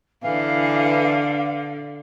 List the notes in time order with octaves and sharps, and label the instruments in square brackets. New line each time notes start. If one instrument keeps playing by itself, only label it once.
[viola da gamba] D3 [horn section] E3 [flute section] F5